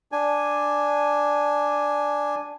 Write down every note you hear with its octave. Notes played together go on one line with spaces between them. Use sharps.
D4 G#5